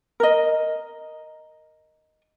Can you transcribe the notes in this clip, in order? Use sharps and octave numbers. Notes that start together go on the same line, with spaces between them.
A#4 D#5